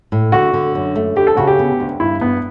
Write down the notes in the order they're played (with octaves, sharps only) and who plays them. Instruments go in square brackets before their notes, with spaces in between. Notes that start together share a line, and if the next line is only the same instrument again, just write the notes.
[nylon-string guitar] A2
[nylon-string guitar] D3 [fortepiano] F#4
[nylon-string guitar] D3
F#2
A3
[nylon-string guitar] D2 [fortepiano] G4
[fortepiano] A4
[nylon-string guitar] C#3 [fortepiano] F#4
[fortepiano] G4
[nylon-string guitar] B3
D2
[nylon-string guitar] G2 [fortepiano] E4
[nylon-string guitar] G2 [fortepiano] B3